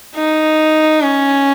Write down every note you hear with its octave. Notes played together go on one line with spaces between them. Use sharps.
D#4
C#4